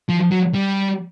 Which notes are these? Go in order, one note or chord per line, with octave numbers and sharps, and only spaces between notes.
F3
F#3
G3